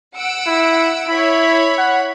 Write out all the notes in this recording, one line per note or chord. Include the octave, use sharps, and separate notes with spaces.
F#5 E6 D7
E4
E4 C#5 B5
F#5